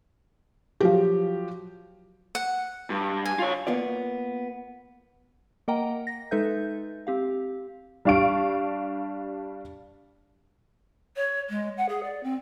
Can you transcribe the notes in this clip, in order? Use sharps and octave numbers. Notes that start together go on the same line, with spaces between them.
F3 F#3 G4
F#5
G2
G#5
F4 C#5
A#3 B3 F4 D5
A#3 A#4 D#5 F#5 G5 A#5
A#6
G#3 D#4 A4 B4 E5 G6
C4 G4 F5
G3 D4 F5 C#6 D7
C#5
G#3
F#5
G#4
D5
C4